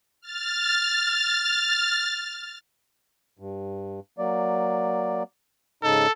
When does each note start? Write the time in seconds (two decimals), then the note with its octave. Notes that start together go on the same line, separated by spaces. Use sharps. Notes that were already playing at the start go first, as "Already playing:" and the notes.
0.21 F6 A6
3.39 G2
4.19 F#3 A#3 D5
5.83 G#2 C#3 D#4 A4